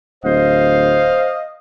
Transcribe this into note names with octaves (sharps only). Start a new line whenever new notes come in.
D1 C5 D#5 F5